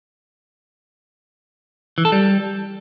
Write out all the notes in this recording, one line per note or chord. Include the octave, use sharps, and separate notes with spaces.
E3
A4
G3